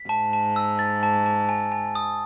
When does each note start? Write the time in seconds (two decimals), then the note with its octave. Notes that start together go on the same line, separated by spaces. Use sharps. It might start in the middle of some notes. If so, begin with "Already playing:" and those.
Already playing: B6
0.09 G#2 A5
0.33 A5
0.56 E6
0.79 A6
1.03 A5
1.26 A5
1.49 G#5
1.72 G#5
1.95 D#6